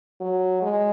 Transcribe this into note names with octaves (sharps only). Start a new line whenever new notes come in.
F#3
G#3